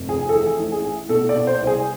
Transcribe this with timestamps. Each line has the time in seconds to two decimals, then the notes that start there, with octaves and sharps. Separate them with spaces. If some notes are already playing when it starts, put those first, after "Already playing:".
Already playing: F1
0.08 F2 G#4
0.29 A4
0.34 E3 G#4
0.60 A1
0.72 G#4
0.85 A2
1.09 B2 A4
1.29 D5
1.35 B2
1.47 C5
1.61 C2
1.67 G#4